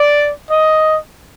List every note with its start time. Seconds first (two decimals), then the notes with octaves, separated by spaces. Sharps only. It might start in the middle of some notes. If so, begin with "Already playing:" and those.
Already playing: D5
0.51 D#5